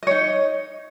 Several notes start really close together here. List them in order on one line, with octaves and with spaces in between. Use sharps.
D#5 C#5 D#4